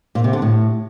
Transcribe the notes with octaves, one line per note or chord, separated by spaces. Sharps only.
A#2
C3
D3
A2